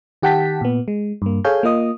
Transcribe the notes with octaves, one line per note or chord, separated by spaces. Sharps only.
D#3 G4 F#5 G5 A5 B6
A#2 B3
G#3
G2 A#3
G#4 A4 C#5 F5 G#5 G6
A#3 F4 D#5 D#6